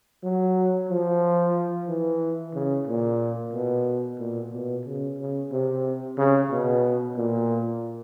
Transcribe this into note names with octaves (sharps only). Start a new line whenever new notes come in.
F#3
F3
E3
C#3
A#2
B2
A#2
B2
C#3
C#3
C3
C#3
B2
A#2